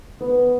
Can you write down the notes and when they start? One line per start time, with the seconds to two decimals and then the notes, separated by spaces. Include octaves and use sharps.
0.21 B3